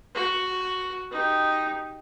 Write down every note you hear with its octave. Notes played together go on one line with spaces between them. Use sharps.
F#4
D#4 G4